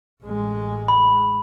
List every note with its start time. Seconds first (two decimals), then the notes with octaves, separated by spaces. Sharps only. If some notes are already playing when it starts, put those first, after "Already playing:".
0.24 A1 G#3
0.88 B5